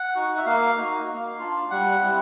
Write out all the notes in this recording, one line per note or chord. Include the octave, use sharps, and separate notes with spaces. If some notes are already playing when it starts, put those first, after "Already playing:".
Already playing: F#5
D#4 F#4
E5
A#3 F5
D#4 F#4
A#3
D4 F4
G3 F#5
C4 E4